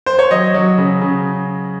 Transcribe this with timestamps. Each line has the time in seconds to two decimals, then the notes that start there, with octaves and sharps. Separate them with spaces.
0.06 C5
0.19 C#5
0.31 F#3 D#5
0.54 F#3
0.78 C#3
1.01 C#3